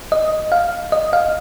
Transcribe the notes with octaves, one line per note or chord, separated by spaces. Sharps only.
D#5
F5
D#5
F5